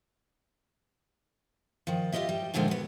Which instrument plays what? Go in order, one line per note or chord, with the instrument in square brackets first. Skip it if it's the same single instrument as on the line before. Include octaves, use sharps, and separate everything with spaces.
[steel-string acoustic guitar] D#3 F3
F4 G4 A#4 D#5 E5
G3
A#2 D3 D#3 F3 G#3 A#3
B3 F#4